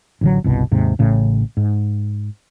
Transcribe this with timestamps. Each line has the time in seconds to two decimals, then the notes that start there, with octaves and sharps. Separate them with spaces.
0.21 A1 D3 F#3
0.44 G1 C2 B2
0.71 D#2 G#2 C3
0.99 A1 A2 C#3
1.57 G#2